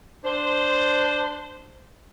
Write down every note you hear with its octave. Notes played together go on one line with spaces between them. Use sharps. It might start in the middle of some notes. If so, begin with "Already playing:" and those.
D4 C5